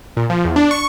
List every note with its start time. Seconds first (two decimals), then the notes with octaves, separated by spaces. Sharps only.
0.17 A#2
0.30 F3
0.45 E2
0.56 D4
0.71 C#6